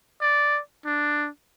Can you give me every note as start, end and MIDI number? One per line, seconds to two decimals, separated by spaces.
0.21 0.60 74
0.86 1.28 62